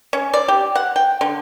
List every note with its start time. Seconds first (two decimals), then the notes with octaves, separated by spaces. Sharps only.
0.13 C#4
0.34 D5
0.48 G4
0.75 F#5
0.96 G5
1.21 D3